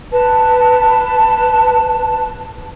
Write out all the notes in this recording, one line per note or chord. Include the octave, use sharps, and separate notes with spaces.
B4 A5